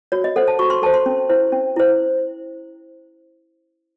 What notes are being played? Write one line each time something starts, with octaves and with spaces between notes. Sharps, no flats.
F#4 C#5
D#5
A4 C5 F#5
A5
F#4 C#6
C6
A4 C5 A5
C6
C#4
E4 C5
C#4
E4 C5